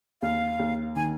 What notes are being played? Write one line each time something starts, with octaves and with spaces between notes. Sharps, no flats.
D#2 F5
D#2
D#3 G#5